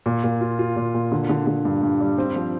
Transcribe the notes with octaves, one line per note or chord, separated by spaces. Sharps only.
A#2
A#2
F4
F4
A#2
A#2
D3
D3
D3
G2
G2
G3
C4
F3